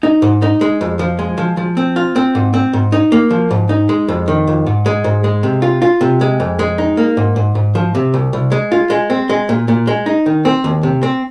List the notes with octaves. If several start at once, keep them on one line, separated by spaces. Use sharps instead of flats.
D#4
G#2
D#4
G#3
F2
F3
G#3
F3
F3
C4
F4
C4
G#2
C4
G#2
D#4
A#3
F3
G#2
D#4
G#3
F2
D#3
F2
G#2
G#3
G#2
G#3
C3
F4
F4
C3
G#3
F2
G#3
D#4
A#3
G#2
G#2
G#2
F3
C3
C2
C2
G#3
F4
G#3
C4
G#3
A#2
A#2
G#3
D#4
D#3
C4
D#2
C3
C4